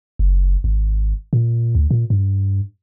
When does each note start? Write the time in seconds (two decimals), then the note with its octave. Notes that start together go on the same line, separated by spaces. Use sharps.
0.19 F#1
0.64 G#1
1.33 A#2
1.75 D2
1.91 A#2
2.10 G2